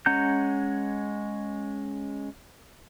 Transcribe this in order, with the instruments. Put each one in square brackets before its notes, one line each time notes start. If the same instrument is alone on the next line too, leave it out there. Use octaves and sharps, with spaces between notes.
[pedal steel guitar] G#3 C#4 F#5 A#5 G6